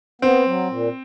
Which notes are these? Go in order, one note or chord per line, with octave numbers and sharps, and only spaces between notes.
B3 C4
F#3
A#2